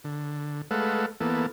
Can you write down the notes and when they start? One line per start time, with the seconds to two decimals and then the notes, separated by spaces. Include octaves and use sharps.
0.04 D3
0.71 G#3 A3 A4 B4 F5 F#5
1.21 E3 A#3 B3 A4